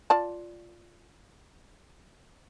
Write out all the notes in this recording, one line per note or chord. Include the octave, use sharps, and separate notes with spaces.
F4 D5 A5